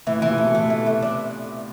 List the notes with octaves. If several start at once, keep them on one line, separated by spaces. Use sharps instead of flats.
A2 E3
A#2 E3
C3
B2 A3
A2 A3
E3
E3
D4